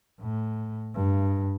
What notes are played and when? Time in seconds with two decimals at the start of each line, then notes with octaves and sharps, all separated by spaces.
0.21 A2
0.95 G2